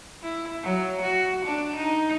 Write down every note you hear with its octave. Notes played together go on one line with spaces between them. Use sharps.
E4
F#3
F#4
D4
D#4